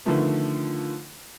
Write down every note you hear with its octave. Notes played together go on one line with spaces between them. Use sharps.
D3 D#3 F3 A3 B3